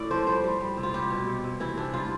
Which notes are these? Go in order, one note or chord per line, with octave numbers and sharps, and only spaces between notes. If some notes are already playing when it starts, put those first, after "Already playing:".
Already playing: A2 D5
F3 C5
G3 C5
G3
G3
C3
F4
G3 G4
B2
C3
C3
E3 E4
C3 D4
G3 F4